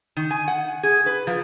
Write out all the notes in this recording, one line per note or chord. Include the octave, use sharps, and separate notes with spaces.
D#3
G#5
F#5
G#4
B4
F3